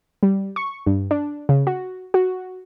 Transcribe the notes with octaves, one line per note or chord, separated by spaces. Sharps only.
G3
C#6
G2
D4
C#3
F#4
F#4